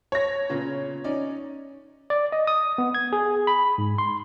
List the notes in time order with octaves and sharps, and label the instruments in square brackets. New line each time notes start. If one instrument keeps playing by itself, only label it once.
[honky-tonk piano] C#5 A#6
[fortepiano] A#2 C#3 B3
C#4 D#4 D5
[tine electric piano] D5
D#5
D#6
B3
G#6
G#4
B5
G#2
C6